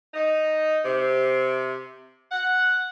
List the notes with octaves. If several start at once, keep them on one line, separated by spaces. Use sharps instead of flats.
D#4
C3
F#5